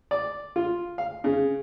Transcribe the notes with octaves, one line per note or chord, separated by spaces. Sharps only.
D5
F4
F5
C#3